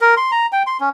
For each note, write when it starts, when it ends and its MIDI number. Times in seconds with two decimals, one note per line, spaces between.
0.01 0.15 70
0.17 0.31 84
0.32 0.46 82
0.52 0.63 79
0.67 0.77 84
0.80 0.89 61